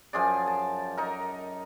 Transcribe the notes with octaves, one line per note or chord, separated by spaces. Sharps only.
F#2 F3 G#4 D5
A5
D#4 A#4